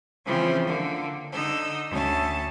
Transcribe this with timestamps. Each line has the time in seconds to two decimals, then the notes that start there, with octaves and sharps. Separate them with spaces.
0.25 C#3 E3 F3 C4 C#4
0.65 D3 A#3
1.31 D3 D#4 E6
1.90 D2 C#4 A5